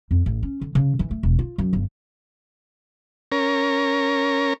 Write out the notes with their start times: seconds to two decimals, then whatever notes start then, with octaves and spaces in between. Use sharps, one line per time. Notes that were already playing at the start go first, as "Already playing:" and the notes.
0.11 F2
0.26 A1
0.43 C#4
0.61 D3
0.75 C#3
0.99 E3
1.11 A3
1.23 E1
1.39 F4
1.58 F#2
1.73 G1
3.32 C#4 A#4